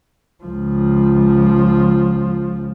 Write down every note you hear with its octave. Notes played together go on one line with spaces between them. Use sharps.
C#2 F3